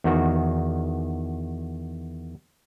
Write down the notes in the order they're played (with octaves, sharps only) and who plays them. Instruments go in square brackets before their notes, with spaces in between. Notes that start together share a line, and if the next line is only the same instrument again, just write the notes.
[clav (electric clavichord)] E2 D#3 F#4